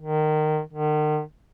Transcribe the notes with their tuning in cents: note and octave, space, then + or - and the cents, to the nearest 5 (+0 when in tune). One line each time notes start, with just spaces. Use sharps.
D#3 -20
D#3 -40